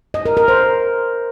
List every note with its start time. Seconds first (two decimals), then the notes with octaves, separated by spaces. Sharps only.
0.14 D#5
0.25 A#4
0.37 A#4
0.48 C5